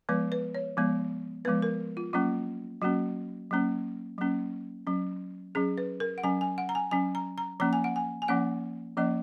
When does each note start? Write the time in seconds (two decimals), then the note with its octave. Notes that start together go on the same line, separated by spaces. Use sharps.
0.09 F3 G#3 B3 B4
0.32 B4
0.55 C#5
0.77 F3 G#3 B3
1.45 F3 G#3 B3 B4
1.62 A#4
1.97 F4
2.13 F#3 A#3 C#4 F4
2.82 F#3 A#3 C#4 F#4
3.51 F#3 A#3 C#4
4.18 F#3 A#3 C#4
4.87 F#3 C#4
5.55 F#3 C#4 G#4
5.78 B4
6.00 A#4
6.18 F#5
6.23 F#3 C#4 G#5
6.41 G#5
6.58 F#5
6.69 A#5
6.75 G#5
6.91 F#3 C#4 G#5
7.15 A#5
7.38 A#5
7.60 F3 A#3 C#4 A#5
7.73 G#5
7.84 F#5
7.96 G#5
8.22 G#5
8.28 F3 A#3 C#4 F#5
8.97 F3 A#3 C#4 D#5